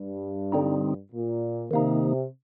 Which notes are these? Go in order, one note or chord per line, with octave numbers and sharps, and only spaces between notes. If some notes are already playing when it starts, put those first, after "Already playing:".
Already playing: G2
D3 G3 C4 D#4
A#2
C3 D#3 A#3 D#4